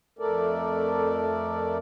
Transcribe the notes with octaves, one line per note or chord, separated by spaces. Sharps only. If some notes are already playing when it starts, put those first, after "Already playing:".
F2 A3 A4 A#4 D5